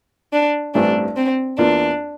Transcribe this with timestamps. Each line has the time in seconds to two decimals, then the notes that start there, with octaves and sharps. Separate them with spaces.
0.33 D4
0.74 A1 G2 E3 A3 C4 D4
1.16 C4
1.58 E2 E3 A#3 D4 F4